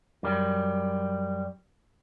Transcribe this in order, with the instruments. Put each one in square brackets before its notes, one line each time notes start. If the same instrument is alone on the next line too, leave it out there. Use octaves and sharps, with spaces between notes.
[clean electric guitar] F#2 G3